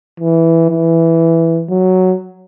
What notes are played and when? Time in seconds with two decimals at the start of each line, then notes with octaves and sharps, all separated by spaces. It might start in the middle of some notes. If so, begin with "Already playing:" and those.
0.20 E3
0.70 E3
1.69 F#3